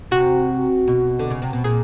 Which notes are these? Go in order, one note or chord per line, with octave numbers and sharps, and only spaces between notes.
C3 F#4
B2
D3
C#3
C3
B2
A#2 G#4